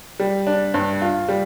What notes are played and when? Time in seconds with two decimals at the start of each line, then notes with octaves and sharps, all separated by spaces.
0.20 G3
0.47 D4
0.74 G2
1.02 F4
1.28 G3